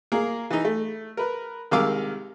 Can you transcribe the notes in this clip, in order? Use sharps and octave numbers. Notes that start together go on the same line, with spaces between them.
A#3 G#4 A#4
E3 D#4
A3
A#4 B4
C2 D#3 G#3 F5 D6 E6